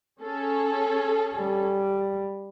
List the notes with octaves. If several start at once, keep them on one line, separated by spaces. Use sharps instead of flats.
C#4 G#4 A4
G3